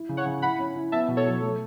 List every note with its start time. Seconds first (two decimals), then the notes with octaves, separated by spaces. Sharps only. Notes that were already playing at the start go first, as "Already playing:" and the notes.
Already playing: E4
0.09 C#3
0.17 C#5 F#5
0.26 C#3
0.42 E4 F#5 B5
0.59 C#4
0.76 E4
0.92 B3 E5 A5
1.08 B2
1.17 A4 C#5
1.26 F#3
1.42 A3